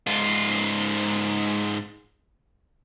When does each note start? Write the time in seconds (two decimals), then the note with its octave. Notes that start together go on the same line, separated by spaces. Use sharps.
0.07 G#2 F4